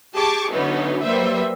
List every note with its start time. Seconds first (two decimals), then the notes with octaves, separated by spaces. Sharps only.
0.14 G4 G#4 A5 C#6 D6
0.53 D3 E3 F#3 B3 C#4 D#4
1.02 F#3 G3 A#3 B4 C5 E5